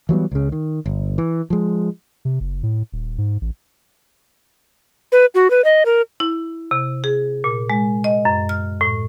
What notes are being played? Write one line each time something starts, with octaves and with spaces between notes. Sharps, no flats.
E3 F#3 G3 B3
C#2 C#3
D#3
G1
E3
F3 G#3
C3
F#1
A2
D#1
G#2
A1
B4
F#4
B4
D#5
A#4
E4
C3
G#4
A#2
G#3
D#5
F#2
F6
A2